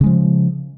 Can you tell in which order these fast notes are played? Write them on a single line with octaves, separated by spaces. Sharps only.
C#3 G#3 F3